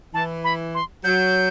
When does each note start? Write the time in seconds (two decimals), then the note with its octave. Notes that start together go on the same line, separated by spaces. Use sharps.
0.14 E3 A5
0.44 B5
0.74 C6
1.04 F#3 G6